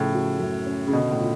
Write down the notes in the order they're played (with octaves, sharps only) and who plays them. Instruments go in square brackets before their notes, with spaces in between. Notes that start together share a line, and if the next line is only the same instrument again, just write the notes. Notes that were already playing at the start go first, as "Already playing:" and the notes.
Already playing: [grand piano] A2 [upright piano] C#3 F3
[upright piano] F#4
F#2
C#4
[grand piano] C#3
[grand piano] B2 [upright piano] D3
[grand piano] A2
[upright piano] F4